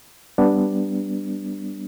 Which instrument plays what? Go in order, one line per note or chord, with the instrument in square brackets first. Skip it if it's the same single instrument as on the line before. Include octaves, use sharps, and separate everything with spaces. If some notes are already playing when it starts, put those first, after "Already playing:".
[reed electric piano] G3 B3 D4